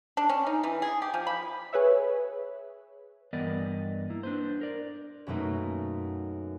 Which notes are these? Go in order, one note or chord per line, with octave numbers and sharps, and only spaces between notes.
D4
C#4
D#4
E3
G#4
G4
F3
B5
G#4 B4 C#5 E5
G2 E3 B3 A#4 D5 D#5
A#3 E4
D4 B4 C5
A#4 D5
F#2 B2 F#3 A3 A#3 D#4